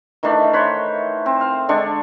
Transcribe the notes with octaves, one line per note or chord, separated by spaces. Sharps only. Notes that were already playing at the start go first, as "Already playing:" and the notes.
D#3 E3 A3 D4
C5 C#5 F#5 B5
C4
F5
D3 G#3 D4 C#6